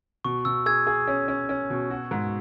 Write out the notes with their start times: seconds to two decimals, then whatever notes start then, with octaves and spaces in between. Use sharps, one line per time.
0.25 B2 C#6
0.45 B2 E6
0.66 G#4 E6 G#6
0.87 G#4
1.08 C#4
1.28 C#4
1.49 C#4
1.70 B2
1.90 F#4
2.11 G#2